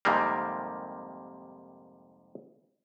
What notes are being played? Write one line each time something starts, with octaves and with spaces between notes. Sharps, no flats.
F2 G#2 C3 D#3 G3 A#3